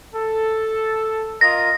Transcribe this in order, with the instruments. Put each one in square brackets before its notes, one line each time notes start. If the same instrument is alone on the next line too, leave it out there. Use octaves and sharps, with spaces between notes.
[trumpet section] A4
[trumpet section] F4 A#4 D#5 [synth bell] A#6